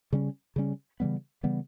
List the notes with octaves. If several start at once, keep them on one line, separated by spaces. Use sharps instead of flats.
C#3 G3 C#4
C#3 G3 C#4
C#3 E3 G3 B3
C#3 E3 G3 B3